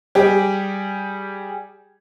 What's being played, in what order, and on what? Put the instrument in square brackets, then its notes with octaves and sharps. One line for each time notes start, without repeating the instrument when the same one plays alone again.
[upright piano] G3 G4 G#4